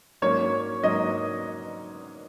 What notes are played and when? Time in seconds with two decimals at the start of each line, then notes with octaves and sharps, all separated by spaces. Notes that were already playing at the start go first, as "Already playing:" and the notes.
0.22 G#2 F#3 A#3 C#4 C#5
0.83 G#2 F#3 A#3 C#4 D#5